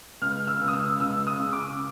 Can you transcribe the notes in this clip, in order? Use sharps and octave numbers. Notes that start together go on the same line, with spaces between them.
C#2 F6
E6
C#2
D#6
E6
C#2 E6
D#6
C#3
D6